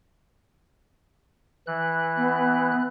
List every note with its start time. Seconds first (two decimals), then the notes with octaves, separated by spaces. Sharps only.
1.67 E3 F#6
2.17 B3